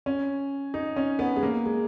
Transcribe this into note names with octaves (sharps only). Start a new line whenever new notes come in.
C#4
D#4
C#4
B3
G#3
A#3
G#3